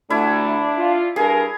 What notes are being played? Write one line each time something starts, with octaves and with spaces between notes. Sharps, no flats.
D2 A3 D4 E4
F4
G2 G#4 A#4